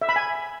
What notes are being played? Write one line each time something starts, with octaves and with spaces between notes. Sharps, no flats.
E5
B5
G#5